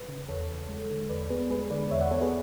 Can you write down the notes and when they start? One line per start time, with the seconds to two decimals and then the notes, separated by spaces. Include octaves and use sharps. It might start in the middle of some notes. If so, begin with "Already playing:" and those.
Already playing: B4
0.09 C#3
0.29 E2 A4 C#5
0.50 E2
0.69 G#3
0.90 D3
1.09 E2 B4 D5
1.30 B3 G#4 B4
1.50 G#3 G#4 B4
1.70 D3 B4 D5
1.91 E2 C#5 E5
2.01 D5 F#5
2.11 B3 A4 C#5
2.21 G#4 B4